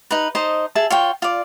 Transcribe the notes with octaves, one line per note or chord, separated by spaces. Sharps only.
D#4 B4
D#4 C5 D#5 A5
G#4 E5 A5
F4 C#5 G5
F4 D5